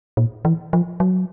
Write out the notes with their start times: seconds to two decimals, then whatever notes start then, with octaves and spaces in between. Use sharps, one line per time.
0.17 A#2
0.45 E3
0.73 F3
1.00 F#3